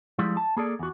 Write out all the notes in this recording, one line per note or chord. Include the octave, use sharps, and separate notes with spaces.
F3 G3 G#3 E4
A5
A#3 G#4 A4 D5
E2 F#4